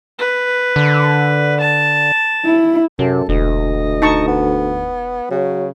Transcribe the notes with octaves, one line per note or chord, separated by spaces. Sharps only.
B4
D3
A5
E4
F#2 C3 A4
E1 D2 D#5
D#4 A5 C#6
B3
C#3 F#3